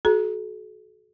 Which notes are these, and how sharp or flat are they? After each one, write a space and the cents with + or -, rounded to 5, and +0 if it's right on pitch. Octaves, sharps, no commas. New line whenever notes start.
F#4 +0 A4 -45 A#5 +20